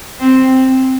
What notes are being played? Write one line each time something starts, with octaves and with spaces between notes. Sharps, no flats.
C4